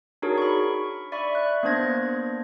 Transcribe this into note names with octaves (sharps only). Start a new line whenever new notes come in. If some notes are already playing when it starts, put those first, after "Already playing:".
D4 D#4 F#4 G#4 A#4 C#5
B5 C#6
D5 E5 B5 C#6
F#6
A#3 B3 D4 C5 G#6 A#6